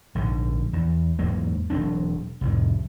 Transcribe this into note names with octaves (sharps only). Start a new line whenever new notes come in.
A#1 G#2 D3
E2
E2 G#2 F#3 A#3
E1 F#3 C4 D4
C2 F2 A2